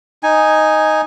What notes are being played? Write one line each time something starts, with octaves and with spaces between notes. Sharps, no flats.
D#4 G#5